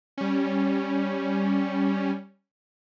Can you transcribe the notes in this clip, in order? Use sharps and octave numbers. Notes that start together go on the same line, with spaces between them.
G3 C#4